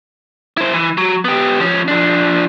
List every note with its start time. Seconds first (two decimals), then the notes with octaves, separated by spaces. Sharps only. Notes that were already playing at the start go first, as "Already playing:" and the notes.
0.57 E4 C5
0.74 E3
0.98 F#3
1.25 B3 G4
1.60 F3 C#4
1.88 F3 D4